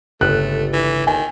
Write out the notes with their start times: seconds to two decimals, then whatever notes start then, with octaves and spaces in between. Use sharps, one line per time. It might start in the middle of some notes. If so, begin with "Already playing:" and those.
0.21 G1 C#2 A3 F#6
0.73 E3
1.07 D#3 G#5